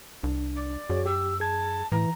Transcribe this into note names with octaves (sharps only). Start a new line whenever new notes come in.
C2 D4
D5
F#2 F#4 G#4 C#5
G4 E6
G#4 A5 G#6
A2 E3 A#5